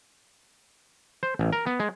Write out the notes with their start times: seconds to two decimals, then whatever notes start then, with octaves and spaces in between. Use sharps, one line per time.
1.23 C5
1.39 A1
1.53 A#4
1.66 B3
1.80 G#3